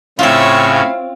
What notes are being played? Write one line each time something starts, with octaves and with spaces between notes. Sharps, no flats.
A2 C#3 C4 E4 F4 C#5 E5 F5